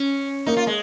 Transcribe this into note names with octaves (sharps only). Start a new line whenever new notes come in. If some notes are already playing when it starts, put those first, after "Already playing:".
Already playing: C#4
A#3 D#4
F4
G#3